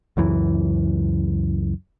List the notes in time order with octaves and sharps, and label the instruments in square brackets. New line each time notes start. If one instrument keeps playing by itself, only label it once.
[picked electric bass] C#2 F#2 E3